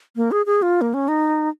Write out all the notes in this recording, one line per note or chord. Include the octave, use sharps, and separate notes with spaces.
A#3
G#4
G#4
F4
A#3
C#4
D#4